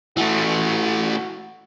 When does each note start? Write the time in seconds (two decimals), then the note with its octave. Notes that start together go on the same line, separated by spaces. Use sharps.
0.17 E3 A3 F#4